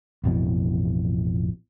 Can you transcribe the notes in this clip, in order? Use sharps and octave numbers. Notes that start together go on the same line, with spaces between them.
A1 F2 B2 E3